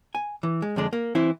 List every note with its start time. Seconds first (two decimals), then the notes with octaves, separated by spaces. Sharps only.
0.15 G#5
0.43 E3
0.62 G#3
0.76 F2 D3 G#3 D4
0.93 A#3
1.15 E3 C4 E4